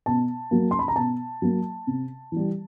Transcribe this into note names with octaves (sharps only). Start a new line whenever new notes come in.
B2 A5
F#3 A#3
C6
B5
A#5
B2 A5
F#3 A#3
C3
E3 G3